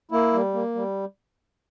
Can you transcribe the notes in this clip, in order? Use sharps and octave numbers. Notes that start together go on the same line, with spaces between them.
A#3 E4
G3
A#3
G3